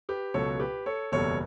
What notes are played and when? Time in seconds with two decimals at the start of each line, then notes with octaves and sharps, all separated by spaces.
0.09 G4 B4
0.34 C#2 B2 F#3 A4 C#5
0.53 A4
0.60 G4 B4
0.86 A4 C#5
1.12 F#1 E2 B2 G3 A4 C#5